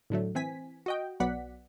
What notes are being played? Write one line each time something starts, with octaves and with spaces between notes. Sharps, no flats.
A2 D3 F#3 A3
E3 C4 G#5 B6
F#4 D#5 G5
B1 F#3 B3 D5 F#5 B6